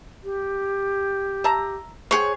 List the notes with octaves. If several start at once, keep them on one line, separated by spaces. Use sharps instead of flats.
G4
E5 A5 A#5
G#4 C5 C#5 F#5 G5